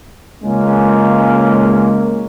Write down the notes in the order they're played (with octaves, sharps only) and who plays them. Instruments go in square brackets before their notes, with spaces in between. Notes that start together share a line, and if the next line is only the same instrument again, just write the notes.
[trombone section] C#2 G#3 A#3 C#4